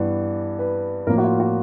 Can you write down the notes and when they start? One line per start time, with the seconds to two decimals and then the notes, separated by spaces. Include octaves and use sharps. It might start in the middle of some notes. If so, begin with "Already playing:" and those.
Already playing: G2 E3 G3 B3
0.59 B4
1.07 A2 F3 A#3 A#4
1.18 F#4
1.24 F4
1.40 F#4